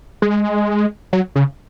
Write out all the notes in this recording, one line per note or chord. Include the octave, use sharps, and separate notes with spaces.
G#3
F#3
C#3